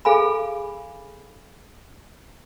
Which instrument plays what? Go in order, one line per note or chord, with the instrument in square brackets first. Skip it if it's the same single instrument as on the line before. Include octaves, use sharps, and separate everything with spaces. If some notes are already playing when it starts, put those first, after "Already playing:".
[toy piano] G#4 A4 F5 G#5 B5